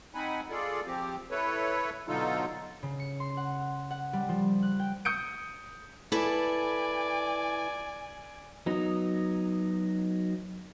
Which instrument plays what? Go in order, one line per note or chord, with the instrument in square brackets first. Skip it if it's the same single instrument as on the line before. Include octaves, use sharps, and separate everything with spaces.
[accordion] C4 D#4 F#5 G#5 B5
F4 G#4 A4 D5
F3 C4 G4
E4 A4 B4 C#5
B2 D3 F#3 D#4 F4 A4
[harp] C#3
C#7
C6
F#5
F#5
G3
F3
F#6
G5
[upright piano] D#6 G6 C#7 D7
[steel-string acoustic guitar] E4 A4 B4 [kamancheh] D5 G#5
[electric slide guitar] F#3 B3 D#4